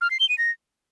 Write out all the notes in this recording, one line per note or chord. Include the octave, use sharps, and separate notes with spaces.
F6
C7
G7
D#7
A#6